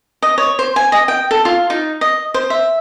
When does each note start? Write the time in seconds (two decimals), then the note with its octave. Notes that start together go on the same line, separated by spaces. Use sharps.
0.22 D#5
0.38 C#5
0.59 C5
0.76 G#5
0.92 D#5
1.08 G5
1.31 A4
1.45 F4
1.70 D#4
2.01 D#5
2.34 C5
2.50 E5